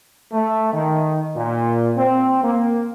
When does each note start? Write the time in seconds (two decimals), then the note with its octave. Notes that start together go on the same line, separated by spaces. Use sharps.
0.32 A3
0.73 D#3
1.35 A#2
1.96 C4
2.43 A#3